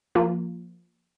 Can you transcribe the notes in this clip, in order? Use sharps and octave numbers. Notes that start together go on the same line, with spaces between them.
F3 A#3 F4